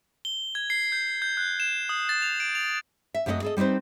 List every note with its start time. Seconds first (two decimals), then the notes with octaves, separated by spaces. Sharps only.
0.25 G7
0.55 G#6
0.70 C7
0.92 G6
1.22 G6
1.37 F#6
1.60 E7
1.89 D#6
2.09 A6
2.22 F7
2.40 D7
2.55 F7
3.14 E5
3.26 F#2 F#3 A3 E4 F#4 D#5
3.43 G#4 A4 D#5
3.57 G3 C4 D#4 B4 C5